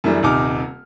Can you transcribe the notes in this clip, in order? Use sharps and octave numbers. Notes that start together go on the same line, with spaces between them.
F#2 E3 G3 A3 D4
D#1 C3 D#4 G#5 D6 F6